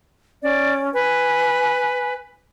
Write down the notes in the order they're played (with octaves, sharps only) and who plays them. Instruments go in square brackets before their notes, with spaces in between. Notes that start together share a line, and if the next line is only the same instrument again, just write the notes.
[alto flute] C#4 [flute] D5
[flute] B4 [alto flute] G#5